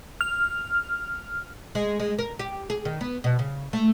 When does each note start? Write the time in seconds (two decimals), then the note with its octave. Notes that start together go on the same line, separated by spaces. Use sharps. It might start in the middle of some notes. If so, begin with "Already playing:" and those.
0.21 F6
1.75 G#3
2.00 G#3
2.19 A#4
2.39 G4
2.70 G#4
2.85 D#3
3.01 B3
3.24 B2
3.39 C#3
3.73 A3